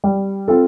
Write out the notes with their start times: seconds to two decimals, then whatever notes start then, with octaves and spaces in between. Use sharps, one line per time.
0.04 G3
0.48 C4 F4 A4